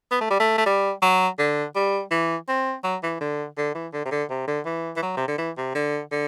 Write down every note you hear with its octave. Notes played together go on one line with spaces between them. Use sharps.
B3
A3
G3
A3
A3
G3
F#3
D3
G3
E3
C4
F#3
E3
D3
D3
E3
D3
C3
D3
C3
D3
E3
E3
F#3
C3
D3
E3
C3
D3
D3